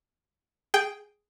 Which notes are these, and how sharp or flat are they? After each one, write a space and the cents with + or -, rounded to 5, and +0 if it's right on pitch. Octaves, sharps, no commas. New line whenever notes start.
G#4 +0 G5 +0